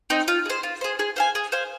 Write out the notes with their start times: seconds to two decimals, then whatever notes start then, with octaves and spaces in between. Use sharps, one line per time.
0.10 C4 D#4
0.28 F4
0.46 G#4 C5
0.63 F4
0.81 G#4 C5
0.99 G#4
1.16 C5 F5 G#5
1.35 G#4
1.52 C5 F5 G#5